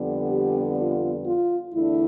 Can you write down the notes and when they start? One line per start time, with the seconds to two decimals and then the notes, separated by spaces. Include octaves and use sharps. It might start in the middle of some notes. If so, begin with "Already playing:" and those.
Already playing: F2 D3 G3 B3
0.30 G4
0.77 F4
1.26 F4
1.74 E2 D3 A3 D4 E4